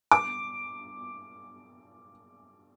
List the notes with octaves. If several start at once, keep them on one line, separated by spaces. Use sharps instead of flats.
D6